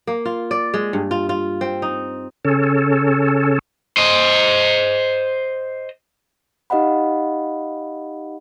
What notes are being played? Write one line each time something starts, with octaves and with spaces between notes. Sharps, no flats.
A#3
F4
D5
G#3
G2
F4
F4
C4
D#4
C#3 C#4 A4
C5 D#5
D#4 G4 D#5 F5 F#5 B5